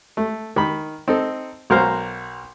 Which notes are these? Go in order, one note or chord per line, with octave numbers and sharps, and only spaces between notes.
A3
D#3 B5
C4 D#4 A4
B1 F#4 A#4 C5 F5 A#5